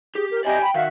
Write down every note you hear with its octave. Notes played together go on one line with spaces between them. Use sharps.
G4 G#4
A#4
E4 G4 D5 D#5 G#5
G5 B5
D#3 F#4 E5 F5